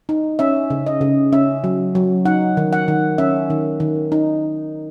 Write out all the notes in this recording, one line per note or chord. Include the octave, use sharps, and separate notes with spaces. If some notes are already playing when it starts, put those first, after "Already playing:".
D#4
C#4 E5
C#3
D#5
C#3
C#4 E5
F#3
F#3
D#4 F#5
D#3
F#5
D#3
C#4 E5
D#3
D#3
D#4